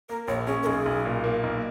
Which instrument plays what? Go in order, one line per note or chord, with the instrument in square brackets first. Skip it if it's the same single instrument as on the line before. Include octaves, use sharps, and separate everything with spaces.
[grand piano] A#3 [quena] A#4
[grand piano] A#1 [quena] C#5
[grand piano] C#4 [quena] G#4
[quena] A#4
[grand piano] B1 [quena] G#4
[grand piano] B1
A#2
A#3
B1